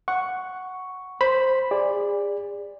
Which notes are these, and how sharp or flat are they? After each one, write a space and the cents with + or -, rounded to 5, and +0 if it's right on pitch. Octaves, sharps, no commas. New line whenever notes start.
F#5 +0 C#6 +0
C5 +0 B5 +0
G#4 -35 D5 +0